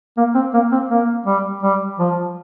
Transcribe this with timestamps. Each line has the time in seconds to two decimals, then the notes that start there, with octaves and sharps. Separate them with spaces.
0.17 A#3
0.35 C4
0.54 A#3
0.72 C4
0.90 A#3
1.26 G3
1.63 G3
1.99 F3